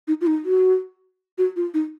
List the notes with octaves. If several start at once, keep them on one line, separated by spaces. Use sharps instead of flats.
D#4
F4
D#4
F#4
F#4
F4
D#4